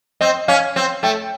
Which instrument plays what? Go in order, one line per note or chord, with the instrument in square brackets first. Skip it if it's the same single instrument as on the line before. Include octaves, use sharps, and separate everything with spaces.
[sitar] C4 [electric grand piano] D#5
[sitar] C#4 [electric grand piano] F5
[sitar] C4
[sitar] A3 [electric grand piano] G5